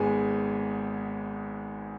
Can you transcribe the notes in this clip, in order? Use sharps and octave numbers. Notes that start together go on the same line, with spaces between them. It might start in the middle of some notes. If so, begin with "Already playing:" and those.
Already playing: G#1 G#2 G#3 B3 G#5